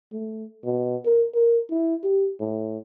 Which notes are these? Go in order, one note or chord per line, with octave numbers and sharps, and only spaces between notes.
A3
B2
A#4
A#4
E4
G4
A2